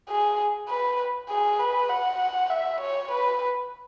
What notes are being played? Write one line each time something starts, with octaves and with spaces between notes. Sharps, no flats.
G#4
B4
G#4
B4
F#5
E5
C#5
B4